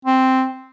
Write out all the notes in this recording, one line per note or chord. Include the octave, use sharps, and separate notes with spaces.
C4